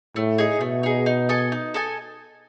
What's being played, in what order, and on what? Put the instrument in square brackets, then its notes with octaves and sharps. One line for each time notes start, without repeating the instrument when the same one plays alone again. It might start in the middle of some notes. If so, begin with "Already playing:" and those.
[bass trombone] A2 [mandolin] A3
[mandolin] D#4 G#4
[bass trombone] B2 [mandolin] A3
[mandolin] D#4 G#4
D#4
A4 D#5 G#5
D#4
A4 D#5 G#5